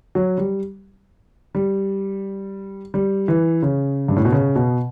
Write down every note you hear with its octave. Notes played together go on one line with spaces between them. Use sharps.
F#3
G3
G3
G3
E3
C#3
G2
A2
B2
C#3
B2